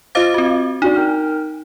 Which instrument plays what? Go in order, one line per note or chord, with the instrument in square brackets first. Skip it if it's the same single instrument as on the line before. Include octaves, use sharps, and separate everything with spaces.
[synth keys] F4 D#5 D6 [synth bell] C5 F5 A6
[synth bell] C4 F#4
[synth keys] D4 F#4 D5 [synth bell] D#4
[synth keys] A#4 G5 F6